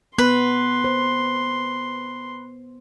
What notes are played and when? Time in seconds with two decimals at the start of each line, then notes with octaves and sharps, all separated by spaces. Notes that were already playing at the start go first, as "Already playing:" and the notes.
0.18 B3 B4 C6
0.84 C5